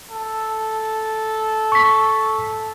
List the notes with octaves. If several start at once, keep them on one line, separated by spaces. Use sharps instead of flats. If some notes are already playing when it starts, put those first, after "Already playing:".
A4
C#6 B6